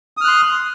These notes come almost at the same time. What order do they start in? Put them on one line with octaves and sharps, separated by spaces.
D#6 F6 F#6 C6